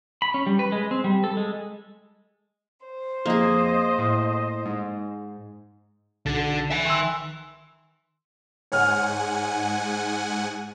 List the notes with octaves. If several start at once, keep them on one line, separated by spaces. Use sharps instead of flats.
B5
C#4
G3
B4
G#3
C4
G3
A4
G#3
C5
F2 A#3 G#4 D#5
A2
G#2
B1 D3 A6
E5 G#5
D#3 C6 E6
G#2 C#5 F#5 G#5 F6